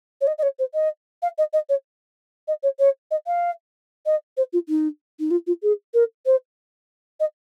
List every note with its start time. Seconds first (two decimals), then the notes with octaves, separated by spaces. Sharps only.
0.21 C#5
0.27 D#5
0.38 D#5
0.42 C#5
0.59 C5
0.74 D#5
1.22 F5
1.38 D#5
1.53 D#5
1.69 C#5
2.47 D#5
2.63 C#5
2.79 C#5
3.10 D#5
3.26 F5
4.05 D#5
4.37 C5
4.52 F4
4.68 D#4
5.19 D#4
5.30 F4
5.46 F4
5.62 G#4
5.93 A#4
6.25 C5
7.19 D#5